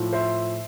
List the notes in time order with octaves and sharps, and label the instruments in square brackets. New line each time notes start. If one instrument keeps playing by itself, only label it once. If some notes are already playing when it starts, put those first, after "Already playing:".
Already playing: [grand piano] A2 F3
C5 E5